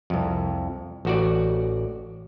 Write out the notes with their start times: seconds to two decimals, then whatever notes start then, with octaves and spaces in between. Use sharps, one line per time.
0.10 C2 F2
1.05 A1 F#4 D5